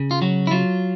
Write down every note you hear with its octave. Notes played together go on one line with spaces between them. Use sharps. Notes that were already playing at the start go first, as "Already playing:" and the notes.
Already playing: C#3
F4
F#3 F#4
E4
F#3 F4